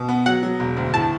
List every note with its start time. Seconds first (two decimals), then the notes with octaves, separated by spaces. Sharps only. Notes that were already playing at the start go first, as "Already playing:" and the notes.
Already playing: B2
0.08 B3
0.26 F#3 F#5
0.43 F#3
0.60 E1
0.77 D2
0.94 A2 A5